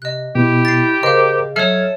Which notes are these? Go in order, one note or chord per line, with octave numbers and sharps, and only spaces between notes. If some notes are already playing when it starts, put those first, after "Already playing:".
C3 D#5 F#6
B2 E4 G4
A6 C7
C#3 A#4 C5 D#5 F5 D6
F#3 A4 C#5 E5 F6 G#6